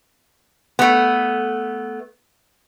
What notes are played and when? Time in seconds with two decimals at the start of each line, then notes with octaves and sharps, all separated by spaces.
0.79 A3 B3